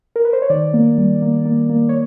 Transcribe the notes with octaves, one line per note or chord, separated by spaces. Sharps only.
A#4
B4
C5
C#5
D#3 D5
A#3
G3
A#3
A#3
A#3
C#5